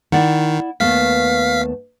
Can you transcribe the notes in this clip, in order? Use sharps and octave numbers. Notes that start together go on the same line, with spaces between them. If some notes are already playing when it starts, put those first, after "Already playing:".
D#3 E4 D5 F#5
D#2 A3 B3 F5 B6